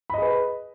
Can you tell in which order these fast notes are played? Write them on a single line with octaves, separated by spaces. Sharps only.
B5 D#5 G#4 B4